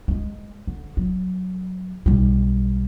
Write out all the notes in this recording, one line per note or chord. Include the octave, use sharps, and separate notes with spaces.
G#3 A3
D3
F#3
B1 G3